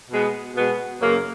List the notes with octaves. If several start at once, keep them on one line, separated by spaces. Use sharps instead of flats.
B2 G#3 B3
B2 G#3 B3
F#2 C#3 F#3 A#3